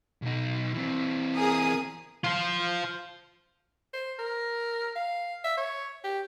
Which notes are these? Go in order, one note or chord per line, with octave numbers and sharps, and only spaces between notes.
B1 D#4
E3 C4
G#4 A#4 D#6
F4 C5
C5
A#4
F5
E5
C#5
G4